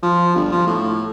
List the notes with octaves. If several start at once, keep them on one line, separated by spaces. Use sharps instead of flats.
F3
G1
F3
A2